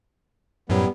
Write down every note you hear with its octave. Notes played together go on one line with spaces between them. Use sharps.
F#2 A2 F#3 G3 B3